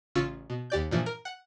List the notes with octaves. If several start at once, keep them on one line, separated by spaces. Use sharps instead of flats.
A1 C#3 F4 C#6 E6 C#7
B2
D#2 G4 D5 G6
G2 A#2 E3 F3
A#4
F#5